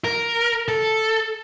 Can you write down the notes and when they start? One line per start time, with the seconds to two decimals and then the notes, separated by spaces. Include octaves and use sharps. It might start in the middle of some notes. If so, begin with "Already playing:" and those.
0.04 A#4
0.68 A4